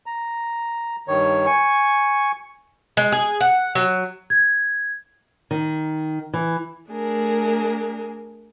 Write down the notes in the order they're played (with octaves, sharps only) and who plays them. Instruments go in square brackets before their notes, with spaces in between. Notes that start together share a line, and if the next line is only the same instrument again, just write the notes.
[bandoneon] A#5
G2 D#3 C#5
G#5 C#6
[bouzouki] G#3
G#4
F#5
F#3
[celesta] G#6
[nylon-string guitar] D#3
E3
[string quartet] A3 D4 G#4 A#4